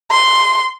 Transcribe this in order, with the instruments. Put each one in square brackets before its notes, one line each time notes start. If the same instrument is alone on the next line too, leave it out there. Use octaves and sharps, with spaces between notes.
[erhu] C6